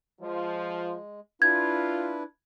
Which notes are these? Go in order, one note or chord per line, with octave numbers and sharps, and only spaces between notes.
F3 G#3
D4 E4 F4 B4 G#6